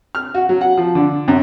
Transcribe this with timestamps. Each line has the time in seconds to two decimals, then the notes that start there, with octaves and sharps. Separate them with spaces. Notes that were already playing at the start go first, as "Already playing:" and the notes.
0.15 F6
0.34 F#4
0.49 F#3
0.61 F#5
0.77 F3
0.95 D3
1.28 F#2